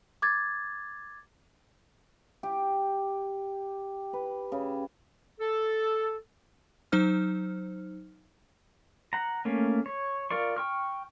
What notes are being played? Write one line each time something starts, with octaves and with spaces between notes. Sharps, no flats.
D6 G#6 A6
G4
B4
C#3
A4
F#3 D#4 C5 F6
F#5 A#5
A3 A#3 C#4
C#5
F4 A#4 D5 C#6
G5 C#6 F6